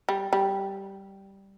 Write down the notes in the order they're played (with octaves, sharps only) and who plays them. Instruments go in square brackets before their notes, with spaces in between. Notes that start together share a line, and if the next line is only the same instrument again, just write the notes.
[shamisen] G3
G3